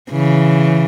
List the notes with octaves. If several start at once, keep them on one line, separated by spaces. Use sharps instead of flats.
C#3 E3